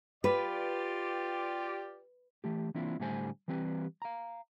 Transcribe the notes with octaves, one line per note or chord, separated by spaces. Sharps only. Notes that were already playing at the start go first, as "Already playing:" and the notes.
F4 G4 B4 D5
E3 A3 G4
E3 A#3 C4 D4 E4 F4
A2 D3 G3 A3 C5 G#5
E3 G3 C4 G4 B4
F5 A#5